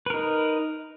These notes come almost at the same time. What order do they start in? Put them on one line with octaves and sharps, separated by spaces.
B4 A#4 D#4